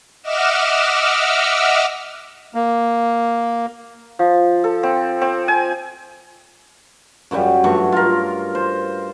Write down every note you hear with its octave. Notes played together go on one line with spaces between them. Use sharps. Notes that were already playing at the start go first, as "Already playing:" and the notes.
D#5 E5 F#5 D6 E6 F6
A#3
F3
A4
C4
C4
G#5
F#2 C#3 F#3 G3
G2 F#3 A3 C#6
F4 A#4
C5